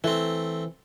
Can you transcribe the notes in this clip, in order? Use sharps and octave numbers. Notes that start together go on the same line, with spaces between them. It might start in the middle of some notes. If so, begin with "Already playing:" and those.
E3 A3 C4